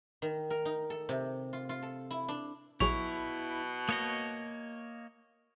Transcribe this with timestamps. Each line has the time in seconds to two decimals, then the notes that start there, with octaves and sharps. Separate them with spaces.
0.22 D#3
0.50 A#4
0.65 D#4
0.90 A4
1.09 C3
1.53 F4
1.69 F4
1.83 A4
2.11 E4
2.28 D4
2.80 A#1 B2 F#3 E4 G#4 C#6 F7
3.89 A#3 C#5 D#5 D#6